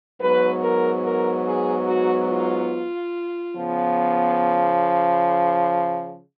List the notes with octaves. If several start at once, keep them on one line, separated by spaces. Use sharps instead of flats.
G#2 F#3 B3 B4
A#4
A#4
G#4
F#4
F4
C#3 F3 B3